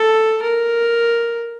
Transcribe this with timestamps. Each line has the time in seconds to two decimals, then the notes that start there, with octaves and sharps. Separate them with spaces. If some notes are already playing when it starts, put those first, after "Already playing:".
Already playing: A4
0.42 A#4